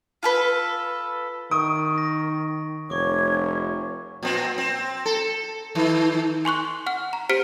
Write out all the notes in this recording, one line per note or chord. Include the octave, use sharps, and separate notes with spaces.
F4 A4 B4
D#3 C#6 D#6 D7
A#6
F1 C#5 C#6 D6
A#2 C4
C4
A4
D#3
G#5 C6 C#6 F#6
F#5 F6
A#5
G4 C5 F6 B6 C#7 D7